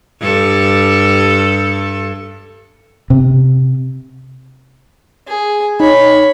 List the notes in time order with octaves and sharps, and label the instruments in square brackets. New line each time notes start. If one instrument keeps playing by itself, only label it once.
[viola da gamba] G2 A4
[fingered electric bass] C3
[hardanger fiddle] G#4
[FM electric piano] D#4 [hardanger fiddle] C#5 B5